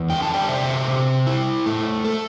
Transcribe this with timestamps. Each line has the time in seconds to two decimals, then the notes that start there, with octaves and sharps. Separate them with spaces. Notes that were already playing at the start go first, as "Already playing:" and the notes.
Already playing: E2
0.10 D3 G5
0.22 A5
0.34 D5 G5
0.49 C3 C5 E5
0.88 C3
1.27 E4
1.66 A3
2.05 A4